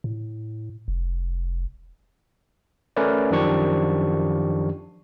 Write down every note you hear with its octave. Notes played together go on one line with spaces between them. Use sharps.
A2
F1
A3 C#4 A#4 B4 D5
F#2 D#3 F3 D4 G4 C#6